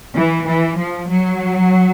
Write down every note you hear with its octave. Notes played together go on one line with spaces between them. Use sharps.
E3
E3
F3
F#3